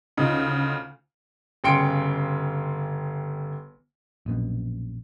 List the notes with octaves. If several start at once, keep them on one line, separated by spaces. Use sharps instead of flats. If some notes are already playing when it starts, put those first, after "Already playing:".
D2 C#3 D#4 F4
G1 C#3 G5 C6 C#7 D7
A#1 F#2 B2